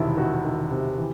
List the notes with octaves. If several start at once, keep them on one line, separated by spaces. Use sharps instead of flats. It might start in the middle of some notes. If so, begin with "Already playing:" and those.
Already playing: E1 C3 D#3 E4
D#3 F#4
D#3
C3
E3